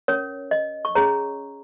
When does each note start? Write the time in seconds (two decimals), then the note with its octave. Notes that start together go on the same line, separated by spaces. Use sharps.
0.08 C#4 A#4 C#5
0.51 D#5
0.85 C#6
0.95 C#4 G#4 C#5 A#5